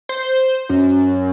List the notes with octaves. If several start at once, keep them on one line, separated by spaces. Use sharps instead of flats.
C5
F#2